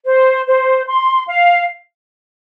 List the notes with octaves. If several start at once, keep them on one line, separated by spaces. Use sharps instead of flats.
C5
C5
C6
F5